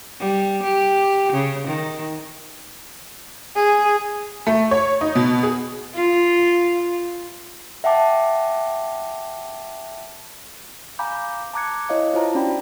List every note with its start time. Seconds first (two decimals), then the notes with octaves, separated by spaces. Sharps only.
0.20 G3
0.63 G4
1.33 C#3
1.67 D#3
3.56 G#4
4.47 A3
4.71 C#5
5.01 D#4
5.15 B2
5.43 G#4
5.94 F4
7.84 E5 F#5 G5 A5 D6
10.99 F5 G#5 A#5 B5 D6 G6
11.54 A5 A#5 D6 F#6 G#6 C#7
11.89 E4 C#5 D#5 F5
12.13 E4 F4 C5 A5 A#5
12.35 C#4 D4 F#4 D5 G5 B5